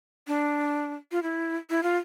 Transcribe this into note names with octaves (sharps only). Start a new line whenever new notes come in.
D4
F4
E4
E4
F4